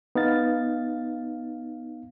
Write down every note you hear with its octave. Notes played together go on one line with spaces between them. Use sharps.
B3 D#4 F5 A6